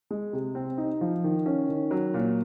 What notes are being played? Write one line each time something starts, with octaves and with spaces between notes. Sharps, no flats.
G#3
C3
C4
D#4
F3
D#3
C#4
D#3
F#3
A#2